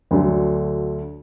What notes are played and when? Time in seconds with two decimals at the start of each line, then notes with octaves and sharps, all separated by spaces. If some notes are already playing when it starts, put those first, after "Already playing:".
0.11 D2 D3 F#3